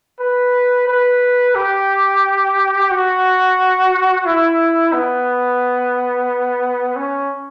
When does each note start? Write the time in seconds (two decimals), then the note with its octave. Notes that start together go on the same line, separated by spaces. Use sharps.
0.20 B4
0.87 B4
1.55 G4
2.91 F#4
4.25 E4
4.93 B3
6.96 C#4